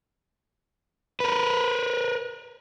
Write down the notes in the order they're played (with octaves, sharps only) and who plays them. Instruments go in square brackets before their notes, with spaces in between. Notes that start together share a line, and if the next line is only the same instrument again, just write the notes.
[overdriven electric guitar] A#4 B4